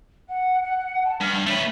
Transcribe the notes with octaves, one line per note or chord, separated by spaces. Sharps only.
F#5
F#5
A5
G2 F6
A3 B4 C#5